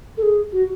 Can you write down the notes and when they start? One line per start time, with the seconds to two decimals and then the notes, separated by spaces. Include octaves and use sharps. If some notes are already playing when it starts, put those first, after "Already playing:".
0.17 A4
0.23 G#4
0.53 F#4